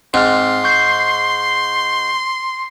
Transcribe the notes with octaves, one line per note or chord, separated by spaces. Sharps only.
G#2 C4 C6 F6
C#6 G6 C7